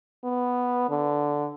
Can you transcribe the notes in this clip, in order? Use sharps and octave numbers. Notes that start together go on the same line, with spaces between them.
B3
D3